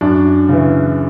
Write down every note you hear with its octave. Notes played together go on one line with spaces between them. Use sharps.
F#2 D4
C#3 E3